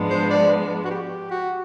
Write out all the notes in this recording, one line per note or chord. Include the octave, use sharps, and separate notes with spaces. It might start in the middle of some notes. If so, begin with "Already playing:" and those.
Already playing: G#2 F3 G#3 B3 D4
C5
D5
F#4
G4
F#4